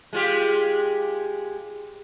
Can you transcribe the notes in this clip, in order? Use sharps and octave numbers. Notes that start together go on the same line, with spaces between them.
G#3 F4 G4